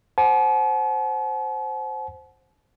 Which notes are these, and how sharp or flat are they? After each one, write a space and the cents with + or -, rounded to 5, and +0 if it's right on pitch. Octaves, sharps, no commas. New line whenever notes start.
C5 +0 F#5 +0 A5 -45